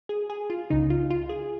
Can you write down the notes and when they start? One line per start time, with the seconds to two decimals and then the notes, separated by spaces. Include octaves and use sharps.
0.09 G#4
0.30 G#4
0.50 F4
0.70 C#2 C#3 D#4
0.90 F4
1.10 F4
1.29 G#4